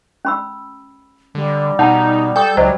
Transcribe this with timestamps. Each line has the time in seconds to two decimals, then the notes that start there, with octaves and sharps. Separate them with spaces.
0.25 C#4 B5 E6
1.35 D3 G3
1.79 B2 D#4 F#5 A5
2.36 A4 G5 D#6 G6
2.57 C#2 F#3 G3 C5 D#5 G5